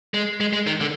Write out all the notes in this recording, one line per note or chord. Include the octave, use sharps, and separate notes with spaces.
G#3
G#3
G#3
D#3
D3